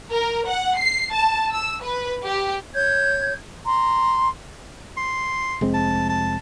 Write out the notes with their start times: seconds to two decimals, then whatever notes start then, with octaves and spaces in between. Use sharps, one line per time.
0.10 A#4
0.47 F#5
0.78 C7
1.12 A5
1.53 E6
1.83 B4
2.25 G4
2.75 C#5 G6 G#6
3.64 A#5 C6
4.97 C6
5.61 F1 G#3 C4
5.74 A5
6.09 A5